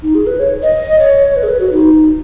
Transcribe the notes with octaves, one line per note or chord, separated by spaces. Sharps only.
D#4
G#4
B4
C#5
D#5
C#5
B4
G#4
B4
F#4
D#4